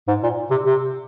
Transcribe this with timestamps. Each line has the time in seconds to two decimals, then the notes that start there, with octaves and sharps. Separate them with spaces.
0.08 G#2
0.23 A#2
0.51 C3
0.66 C3